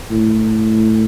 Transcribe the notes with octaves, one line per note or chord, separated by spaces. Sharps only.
A2